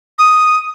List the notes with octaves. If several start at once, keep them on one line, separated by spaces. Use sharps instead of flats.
D#6